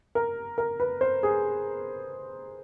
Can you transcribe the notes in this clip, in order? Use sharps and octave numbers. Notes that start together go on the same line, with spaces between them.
A#4
A#4
B4
C5
G#4